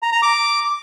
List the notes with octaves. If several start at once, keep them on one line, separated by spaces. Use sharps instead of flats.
A#5
A#5
D6